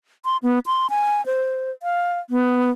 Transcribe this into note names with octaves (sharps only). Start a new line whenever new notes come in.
C6
B3
C6
G#5
C5
F5
B3